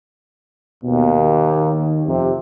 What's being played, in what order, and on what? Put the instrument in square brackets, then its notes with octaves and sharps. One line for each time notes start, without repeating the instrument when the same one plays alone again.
[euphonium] D#2 [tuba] B2
[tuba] D#3
[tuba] F2 [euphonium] C3